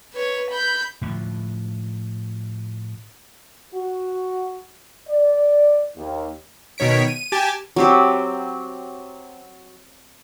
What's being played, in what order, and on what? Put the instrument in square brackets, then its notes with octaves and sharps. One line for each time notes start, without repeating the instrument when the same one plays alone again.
[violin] B4 C#5
B5 G6
[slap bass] A2 D3 F3
[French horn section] F#4
D5
D#2
[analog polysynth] B2 D#3 C#5 B6 D7
D#7
G4 G#5 A5 A6
[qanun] F#3 C4 G4